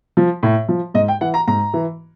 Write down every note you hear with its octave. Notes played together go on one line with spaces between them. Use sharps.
F3
A2
F3
G#2 D#5
G5
E3 F#5
A#5
G#2 A#5
E3